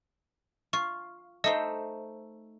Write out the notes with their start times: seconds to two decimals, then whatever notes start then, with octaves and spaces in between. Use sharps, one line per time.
0.73 F4 C#6
1.44 A3 D#4 C5 D#5